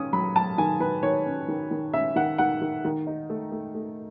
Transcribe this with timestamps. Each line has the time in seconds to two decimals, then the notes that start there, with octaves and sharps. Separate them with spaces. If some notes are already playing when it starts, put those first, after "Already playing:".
Already playing: D#3 C#4 D#6
0.13 F#3 B5
0.36 F#3 A5
0.58 D#3 G#5
0.80 D#3 B4
1.03 D#3 C#5
1.26 C#4
1.48 D#3
1.71 D#3
1.93 C#4 E5
2.16 D#3 F#5
2.38 D#3 F#5
2.62 D#3
2.85 D#3
3.07 D#4
3.30 A3
3.52 A3
3.74 A3